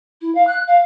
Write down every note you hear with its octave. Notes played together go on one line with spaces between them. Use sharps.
E4
F5
F#6
F5